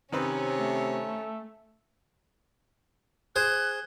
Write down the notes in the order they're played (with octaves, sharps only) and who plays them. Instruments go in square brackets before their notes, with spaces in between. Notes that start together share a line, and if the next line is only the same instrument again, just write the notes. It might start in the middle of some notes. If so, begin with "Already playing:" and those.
[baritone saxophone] C3 [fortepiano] D#3 C4 B4 [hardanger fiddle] C#4 C#5
[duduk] A3
[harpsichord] G#4 C5 [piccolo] F#6